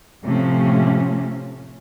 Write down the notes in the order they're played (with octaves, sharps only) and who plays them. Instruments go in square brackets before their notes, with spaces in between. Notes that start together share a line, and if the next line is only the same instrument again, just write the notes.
[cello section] A2 C3 F3 A3 C#4